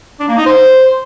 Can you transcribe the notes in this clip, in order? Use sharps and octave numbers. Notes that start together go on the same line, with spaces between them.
D4
A#3
D#4
C5